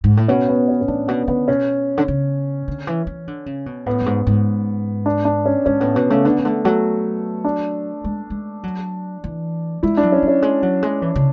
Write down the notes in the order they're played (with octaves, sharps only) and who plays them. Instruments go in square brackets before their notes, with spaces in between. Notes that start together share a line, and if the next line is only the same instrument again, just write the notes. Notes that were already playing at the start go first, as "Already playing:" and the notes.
[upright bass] G#2
A2
[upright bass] B2 [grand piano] C#4
[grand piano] B3
C#4
C#4
[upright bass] A2 [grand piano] D4
[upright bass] B2 [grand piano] B3
[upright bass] D3 [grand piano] B3
[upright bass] B2 [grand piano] C#4
[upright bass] D3
C#3
D3
E3
E3
D3
C#3
B2
[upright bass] A2 [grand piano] B3
[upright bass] F#2
G#2
G#2
[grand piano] D4
D4
C#4
[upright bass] G#2 [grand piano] C#4
[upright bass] A2 [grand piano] B3
[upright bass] B2 [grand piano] B3
[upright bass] C#3 [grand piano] A3
[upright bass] D3 [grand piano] B3
[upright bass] C#3
[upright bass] D3 [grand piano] A3
[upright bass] F#3 [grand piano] A3
[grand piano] D4
[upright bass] G#3
G#3
F#3
E3
[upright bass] G#3 [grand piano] E4
[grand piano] D4
[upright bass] F#3
[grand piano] C#4
[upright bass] F#3
[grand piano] C#4
[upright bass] G#3
F#3
G#3
E3
C#3